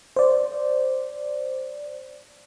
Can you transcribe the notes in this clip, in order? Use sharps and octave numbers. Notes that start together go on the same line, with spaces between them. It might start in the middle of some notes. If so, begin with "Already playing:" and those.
C5 D5